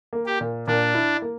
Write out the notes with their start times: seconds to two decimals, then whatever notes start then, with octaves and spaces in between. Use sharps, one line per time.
0.13 A#3
0.26 G4
0.41 A#2
0.67 A#2 D4
0.95 E4
1.22 A#3